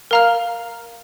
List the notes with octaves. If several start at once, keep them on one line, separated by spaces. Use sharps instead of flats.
A#4 F5 A#5 F6